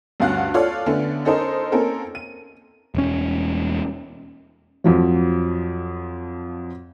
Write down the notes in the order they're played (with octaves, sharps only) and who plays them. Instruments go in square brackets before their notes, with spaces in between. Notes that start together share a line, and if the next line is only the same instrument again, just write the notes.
[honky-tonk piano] D2 G2 C#4 F5 F#5 F#6
F4 A4 C#5 D5 F6
D3 A3 B3 C#4 D4
C#4 D#4 A4 A#4 C5 D#5
A#3 C4 C#4 A4 A#4
D#7
[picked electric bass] E1 C#4
[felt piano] F2 F3 F#3